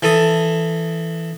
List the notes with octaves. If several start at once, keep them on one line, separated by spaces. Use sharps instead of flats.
E3 A4 D#6